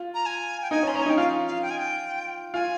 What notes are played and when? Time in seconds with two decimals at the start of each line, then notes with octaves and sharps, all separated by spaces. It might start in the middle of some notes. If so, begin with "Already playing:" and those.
Already playing: F4
0.14 A#5
0.26 G#5
0.62 G5
0.71 D#4 G#5
0.83 C#4
0.88 C6
0.94 C#4 A#5
1.02 G#5
1.06 D#4 G5
1.17 F4 F5
1.48 F5
1.62 G5
1.70 G#5
1.78 G5
2.54 F4 G#5